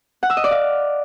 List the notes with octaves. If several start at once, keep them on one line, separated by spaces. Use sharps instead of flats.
F#5
E6
D#5
D5
F5